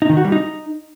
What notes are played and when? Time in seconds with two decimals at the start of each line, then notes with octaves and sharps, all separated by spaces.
0.02 D#4
0.09 D#3
0.17 F#4
0.25 G3
0.32 D#4